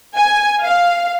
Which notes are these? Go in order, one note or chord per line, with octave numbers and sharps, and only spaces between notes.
G#5
F5